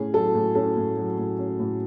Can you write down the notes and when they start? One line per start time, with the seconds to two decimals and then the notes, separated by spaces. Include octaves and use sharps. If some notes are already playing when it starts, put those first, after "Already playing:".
Already playing: A2 C#4 G#4
0.13 F#3 A4
0.35 A2
0.55 C#4 A4
0.76 A2
0.97 F#3
1.18 A2
1.39 C#4
1.59 A2